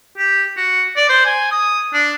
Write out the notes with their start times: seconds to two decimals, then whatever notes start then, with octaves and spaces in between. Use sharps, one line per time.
0.17 G4
0.57 F#4
0.96 D5
1.09 C5
1.25 G#5
1.51 D#6
1.94 D4